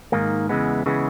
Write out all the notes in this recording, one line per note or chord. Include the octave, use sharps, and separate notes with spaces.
G#2 D#3 A#3
E2 C#3 E3 G#3 B3
C#3 E3 G#3 B3